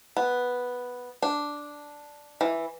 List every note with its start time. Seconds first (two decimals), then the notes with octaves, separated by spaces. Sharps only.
0.17 B3
1.22 D4
2.41 E3